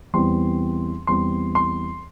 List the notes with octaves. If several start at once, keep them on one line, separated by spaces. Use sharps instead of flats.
E2 E3 G3 C4 C6
E2 E3 G3 C4 C6
C6